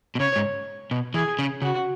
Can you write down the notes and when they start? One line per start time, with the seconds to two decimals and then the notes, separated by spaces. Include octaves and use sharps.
0.15 B2
0.20 C#3 C#5
0.36 G#2
0.91 B2
1.14 E3 G#4
1.39 C#3
1.62 C#3 F#4